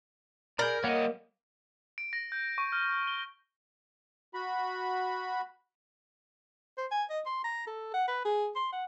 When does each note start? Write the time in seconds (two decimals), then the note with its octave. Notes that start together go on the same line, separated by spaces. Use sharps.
0.59 G#4 A#4 D5 B5 F6 G6
0.84 G3 A#3 C#5 D#5 F#5
1.98 D7
2.13 A#6
2.32 G6
2.58 C#6
2.72 F6
3.07 G7
4.34 F#4 B5
6.78 C5
6.91 G#5
7.10 D#5
7.26 C6
7.44 A#5
7.67 A4
7.94 F#5
8.08 B4
8.25 G#4
8.56 C6
8.73 F#5